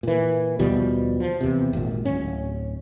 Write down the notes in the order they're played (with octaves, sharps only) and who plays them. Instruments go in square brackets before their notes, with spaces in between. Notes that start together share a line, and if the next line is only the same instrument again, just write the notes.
[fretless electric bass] A#2 E3
D#2 B2 F3 G3
F3
E2 C3
G#1 A#2
D1 C#4